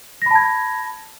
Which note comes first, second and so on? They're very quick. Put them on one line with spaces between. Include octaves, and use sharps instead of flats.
A#6 B5 A5 G#6